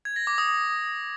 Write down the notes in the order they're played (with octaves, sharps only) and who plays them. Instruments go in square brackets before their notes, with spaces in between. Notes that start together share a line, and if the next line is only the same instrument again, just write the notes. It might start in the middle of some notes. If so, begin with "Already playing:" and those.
[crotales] G#6
A#6
D6
D#6